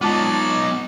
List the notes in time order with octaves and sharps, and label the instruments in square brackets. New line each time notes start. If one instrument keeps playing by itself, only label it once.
[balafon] G#3 F4 A5 [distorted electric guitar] B3 D#4 [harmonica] C#5 D5